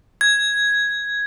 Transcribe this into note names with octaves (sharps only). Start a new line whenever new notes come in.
G#6